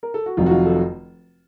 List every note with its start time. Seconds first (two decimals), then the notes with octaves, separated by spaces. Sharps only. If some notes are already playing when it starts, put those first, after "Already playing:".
0.03 A#4
0.14 A4
0.26 F#4
0.37 F1 F2 C3 D#3 F#3 F4
0.46 F#4
0.51 F4
0.65 A4